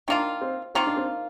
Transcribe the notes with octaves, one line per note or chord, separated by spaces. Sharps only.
D#3 A#3 D4 F4
C4
D#3 A#3 C4 F4
D4
C4